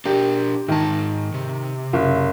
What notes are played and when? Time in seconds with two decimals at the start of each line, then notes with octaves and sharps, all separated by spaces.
0.05 D4 G4 A#4
0.68 G#2 D#3 A5
1.34 C3
1.93 F#1